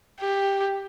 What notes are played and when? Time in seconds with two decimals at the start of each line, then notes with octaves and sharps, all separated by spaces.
0.20 G4